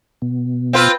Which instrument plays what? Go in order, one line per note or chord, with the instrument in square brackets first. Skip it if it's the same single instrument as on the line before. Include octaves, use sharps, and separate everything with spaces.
[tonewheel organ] B2
[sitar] C4 F4 B4